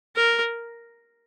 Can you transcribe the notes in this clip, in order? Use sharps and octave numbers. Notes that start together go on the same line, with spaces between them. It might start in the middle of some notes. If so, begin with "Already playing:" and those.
A#4